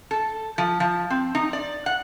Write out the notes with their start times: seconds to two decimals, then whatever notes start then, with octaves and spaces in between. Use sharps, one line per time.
0.11 A4
0.58 F3
0.80 F3
1.10 C4
1.35 D#4
1.53 D5
1.86 F#5